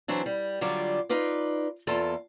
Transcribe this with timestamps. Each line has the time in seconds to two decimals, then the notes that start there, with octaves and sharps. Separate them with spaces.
0.08 E3 F#3 C4 D4
0.26 G3
0.61 D3 F#3 G3 F4 D5
1.09 D#4 F4 B4 D5
1.87 E2 A#3 F4 A4